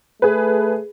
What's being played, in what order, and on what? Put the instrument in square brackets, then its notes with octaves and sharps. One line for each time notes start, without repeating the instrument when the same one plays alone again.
[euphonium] A3 [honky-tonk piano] G#4 B4